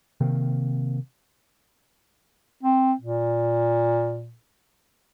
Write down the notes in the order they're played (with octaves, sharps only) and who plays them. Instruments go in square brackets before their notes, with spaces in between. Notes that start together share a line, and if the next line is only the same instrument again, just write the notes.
[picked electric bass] C3 D#3 A#3 C4
[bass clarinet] C4
A#2